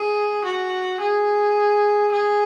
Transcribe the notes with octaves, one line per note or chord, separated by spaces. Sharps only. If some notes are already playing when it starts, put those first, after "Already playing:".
Already playing: G#4
F#4
G#4
G#4